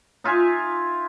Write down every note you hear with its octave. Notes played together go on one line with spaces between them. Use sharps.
D#4 F4 E5 G#5